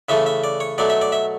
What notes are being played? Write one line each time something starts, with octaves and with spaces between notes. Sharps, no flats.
C#3 E3 A3 E5
E5
D5
C#5
B2 F#3 A3 D5
E5
D5
E5